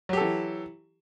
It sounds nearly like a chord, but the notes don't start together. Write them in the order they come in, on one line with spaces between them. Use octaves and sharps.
F#3 G4 A4 E3